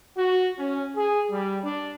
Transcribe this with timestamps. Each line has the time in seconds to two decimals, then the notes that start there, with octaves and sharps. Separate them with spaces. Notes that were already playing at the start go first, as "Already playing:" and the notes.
0.17 F#4
0.58 C#4
0.96 G#4
1.31 G3
1.63 D4